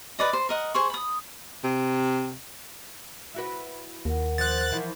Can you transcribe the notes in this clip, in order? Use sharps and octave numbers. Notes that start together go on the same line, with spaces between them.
B4 D5 D#5
C5
A#4 D#5 F#5
G#4 C5 C#6
B5 D#6
C3
E4 F#4 B4
D#2 A#4 F#5
F3 F#6 A6
E3 F3 E4